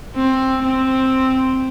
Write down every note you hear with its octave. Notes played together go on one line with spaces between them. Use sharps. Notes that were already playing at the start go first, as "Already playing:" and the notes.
C4
C4